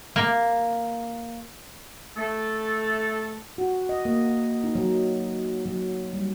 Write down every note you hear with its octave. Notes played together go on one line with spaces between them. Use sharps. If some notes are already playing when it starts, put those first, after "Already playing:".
A#3
A3 A4
F#4
D#5
A#3
D#4
F#3
F#3
G3